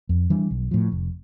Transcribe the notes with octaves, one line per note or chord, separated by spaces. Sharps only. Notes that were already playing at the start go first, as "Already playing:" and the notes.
F2
E3 G3 D4
B1
A2 F3
F1